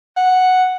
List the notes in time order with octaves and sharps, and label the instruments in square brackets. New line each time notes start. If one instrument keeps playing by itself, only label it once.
[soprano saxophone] F#5